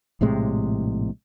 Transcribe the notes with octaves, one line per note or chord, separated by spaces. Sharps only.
A#1 A2 C3 G#3